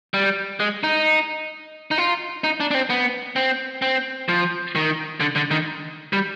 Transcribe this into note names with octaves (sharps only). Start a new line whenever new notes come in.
G3
G#3
D#4
D#4
F4
D#4
D4
D4
C4
B3
C4
C4
F3
D#3
D3
D3
D#3
G3